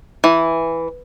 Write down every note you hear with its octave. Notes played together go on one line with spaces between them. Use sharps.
E3